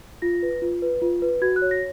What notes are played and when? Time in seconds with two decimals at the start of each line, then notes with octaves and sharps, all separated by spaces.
0.22 F4 A#6
0.42 B4
0.62 F4
0.82 B4
1.02 F4
1.22 B4
1.42 F#4 G#6
1.56 F#6
1.62 C#5
1.71 A#6